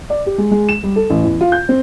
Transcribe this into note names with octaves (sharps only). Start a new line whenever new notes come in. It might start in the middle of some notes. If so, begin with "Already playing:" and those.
D5
G4
G#3
G#3
E7
G3
A4
A1
E2
F4
G6
C4